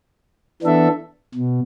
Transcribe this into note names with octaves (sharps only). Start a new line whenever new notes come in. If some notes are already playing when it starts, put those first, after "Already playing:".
E3 B3 D4 A4 E5
B2